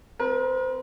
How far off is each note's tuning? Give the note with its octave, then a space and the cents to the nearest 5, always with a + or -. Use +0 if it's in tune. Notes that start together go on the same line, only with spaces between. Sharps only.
C4 -25 A#4 +40